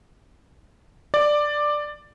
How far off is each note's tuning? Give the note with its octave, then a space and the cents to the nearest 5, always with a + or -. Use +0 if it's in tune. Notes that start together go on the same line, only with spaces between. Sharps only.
D5 +10